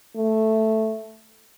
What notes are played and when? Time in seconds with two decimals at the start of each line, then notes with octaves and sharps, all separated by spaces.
0.16 A3